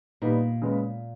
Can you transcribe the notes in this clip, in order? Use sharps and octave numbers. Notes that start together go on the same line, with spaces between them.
A#2 G3 B3 D#4
C#3 G#3 B3